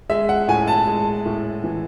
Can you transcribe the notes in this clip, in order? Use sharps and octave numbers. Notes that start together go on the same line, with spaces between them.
G#3 E5
F#5
A2 G#5
A5
G#3
A2
E3